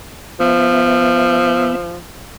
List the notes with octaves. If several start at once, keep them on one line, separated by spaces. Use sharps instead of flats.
F3 B3 E5